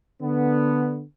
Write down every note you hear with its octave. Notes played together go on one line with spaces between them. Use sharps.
D3 B3